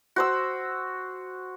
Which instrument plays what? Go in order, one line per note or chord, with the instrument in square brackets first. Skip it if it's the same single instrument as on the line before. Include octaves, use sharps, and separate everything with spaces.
[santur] F#4 C5 E6